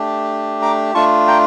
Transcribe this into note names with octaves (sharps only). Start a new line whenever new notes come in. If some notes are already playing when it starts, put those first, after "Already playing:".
Already playing: A3 D4 G4
A#5 D6
A3 D4 F4 A5 C#6
G5 A#5